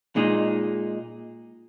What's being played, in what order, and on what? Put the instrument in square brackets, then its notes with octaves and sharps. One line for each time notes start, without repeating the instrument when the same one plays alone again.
[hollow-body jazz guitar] A#2 G#3 D#4